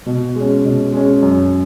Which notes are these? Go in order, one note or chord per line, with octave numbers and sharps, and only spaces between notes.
B2
G#3 C#4
B2
G#3 C#4
F#2